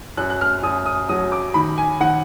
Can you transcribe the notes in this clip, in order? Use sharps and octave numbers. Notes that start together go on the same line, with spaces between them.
F#2 F#6
F#6
F6
F#2 D#6
D#6
F#3 D#6
D6
D#3 B5
G#5
D#3 F#5